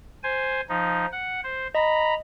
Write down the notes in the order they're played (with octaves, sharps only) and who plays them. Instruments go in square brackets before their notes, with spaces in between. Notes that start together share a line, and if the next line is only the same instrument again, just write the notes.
[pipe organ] C5 G#5
F3 D#4
F#5
C5
[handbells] D#5 [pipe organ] A#5 B5